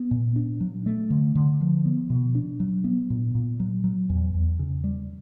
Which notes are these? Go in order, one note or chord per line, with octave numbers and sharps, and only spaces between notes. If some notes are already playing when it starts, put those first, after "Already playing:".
Already playing: B3
A#2
D4
F#3
A3
D3
D3
F3
B3
B2
D4
F#3
B3
A#2
A#2
F#3
F#3
E2
E2
C#3
G3